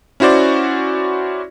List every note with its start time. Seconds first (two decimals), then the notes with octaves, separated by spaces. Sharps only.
0.20 C#4 E4 F#4 C5 D5